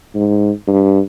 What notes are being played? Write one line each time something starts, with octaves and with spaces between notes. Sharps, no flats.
G#2
G2